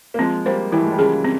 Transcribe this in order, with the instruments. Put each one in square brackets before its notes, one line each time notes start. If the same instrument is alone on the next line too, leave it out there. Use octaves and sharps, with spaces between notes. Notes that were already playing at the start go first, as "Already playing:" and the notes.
[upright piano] A#3
[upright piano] F3 G#3 [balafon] C4
[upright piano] G3 A#3 [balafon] C5
[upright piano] E3 G3 [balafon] E4
[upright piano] G#3
G3
[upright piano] C#3 F3 [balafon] G#4
[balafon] C4